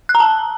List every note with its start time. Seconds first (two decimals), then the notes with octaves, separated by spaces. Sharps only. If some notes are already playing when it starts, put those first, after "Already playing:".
0.09 F#6
0.15 A#5
0.20 A5